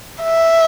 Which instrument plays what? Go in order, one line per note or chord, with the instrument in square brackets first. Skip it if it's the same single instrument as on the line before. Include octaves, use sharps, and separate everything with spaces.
[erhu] E5